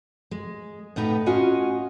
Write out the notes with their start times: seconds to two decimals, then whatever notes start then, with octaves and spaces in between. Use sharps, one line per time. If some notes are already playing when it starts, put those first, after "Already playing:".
0.31 G#3
0.96 A2 B3 D#4 B4
1.26 C#4 F4 F#4 D#5 F#5 G#5